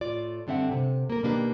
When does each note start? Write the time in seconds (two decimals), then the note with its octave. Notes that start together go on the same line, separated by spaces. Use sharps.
0.01 A2 F4 D5
0.47 G2 D3 C4 E5 F#5
0.72 C3
1.10 A#3 A#4
1.23 B2 D#3 A#3 D4 G4 B4